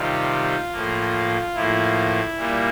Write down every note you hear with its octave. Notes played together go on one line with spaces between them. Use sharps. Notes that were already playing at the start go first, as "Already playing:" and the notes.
Already playing: C3 D#3 G3 F4
A2 F3 A#3
A2 F3 A#3 E4
A#2 G3 A#3